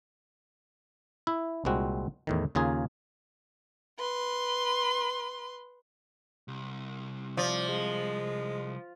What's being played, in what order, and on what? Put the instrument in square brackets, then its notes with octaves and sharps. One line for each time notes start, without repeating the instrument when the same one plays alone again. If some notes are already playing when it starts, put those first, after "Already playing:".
[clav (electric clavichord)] E4 E5
C2 A#2 G#3 C4 F#4
E2 A2 D#3
D#2 C#3 F4 G#4 A#4
[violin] B4 C6
[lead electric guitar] C2
[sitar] F3 [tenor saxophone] D5
[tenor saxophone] G#3